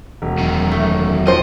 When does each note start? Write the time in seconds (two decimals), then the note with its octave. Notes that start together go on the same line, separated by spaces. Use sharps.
0.22 E1
0.38 F#2 D#3
0.72 A3
1.27 F3 C5 D#5